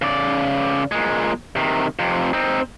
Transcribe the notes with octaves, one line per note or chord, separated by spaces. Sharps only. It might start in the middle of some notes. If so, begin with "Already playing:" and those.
C#3 D5
A#2 G#3
C3 D#3
F2 C3
C4 D#4